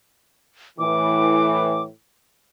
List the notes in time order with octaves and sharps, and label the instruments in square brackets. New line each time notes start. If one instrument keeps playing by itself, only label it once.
[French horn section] A2 E3 [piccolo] D6